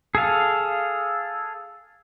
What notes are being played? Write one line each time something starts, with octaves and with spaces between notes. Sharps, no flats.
G#4 A4 F5